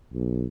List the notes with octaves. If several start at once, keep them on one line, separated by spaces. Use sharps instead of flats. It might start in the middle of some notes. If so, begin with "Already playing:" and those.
B1